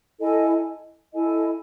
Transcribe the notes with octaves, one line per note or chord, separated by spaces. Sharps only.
E4 A4 D#5 G#5
E4 A4 D#5 G#5